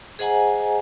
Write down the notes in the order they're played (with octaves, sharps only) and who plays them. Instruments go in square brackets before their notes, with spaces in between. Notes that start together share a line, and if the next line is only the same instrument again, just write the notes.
[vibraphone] G#4 C5 D#5 F#5 G#5 A#5